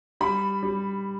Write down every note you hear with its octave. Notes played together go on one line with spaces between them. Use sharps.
G3 B5
G3